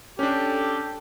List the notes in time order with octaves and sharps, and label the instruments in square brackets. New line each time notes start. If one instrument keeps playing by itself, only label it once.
[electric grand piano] C#4 D4 [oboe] G4 [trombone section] A4